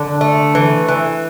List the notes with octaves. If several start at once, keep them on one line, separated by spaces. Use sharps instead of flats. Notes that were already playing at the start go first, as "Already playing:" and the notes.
Already playing: D3
A3
E3
E3